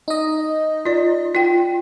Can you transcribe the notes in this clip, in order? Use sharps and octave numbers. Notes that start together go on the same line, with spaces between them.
D#4 D#5
F4 D5
F4 G5